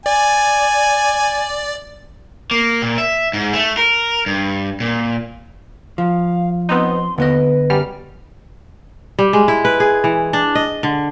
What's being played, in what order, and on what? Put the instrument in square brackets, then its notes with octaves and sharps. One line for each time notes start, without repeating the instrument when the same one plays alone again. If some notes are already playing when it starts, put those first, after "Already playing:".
[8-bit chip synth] D5 [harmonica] G#5
[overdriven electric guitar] A#3
A#2
E5
G#2
A3
A#4
G2
A#2
[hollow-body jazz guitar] F3 [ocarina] F5
[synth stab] B3 C4 D#4 [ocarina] C6
[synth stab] D#2 [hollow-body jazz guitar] D3 B3 D#5 [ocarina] B4
[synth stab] F#2 G3 F6
[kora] G3
G#3
E4
B4
G#4
E3
D4
D#5
D3